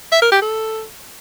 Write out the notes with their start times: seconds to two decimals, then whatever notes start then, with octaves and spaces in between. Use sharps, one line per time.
0.12 E5
0.22 A#4
0.32 G4
0.42 A4